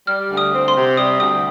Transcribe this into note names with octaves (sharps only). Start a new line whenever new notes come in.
G3 F6
D2
D#6
C4
C6
C3
G3 D#6
D2 D#6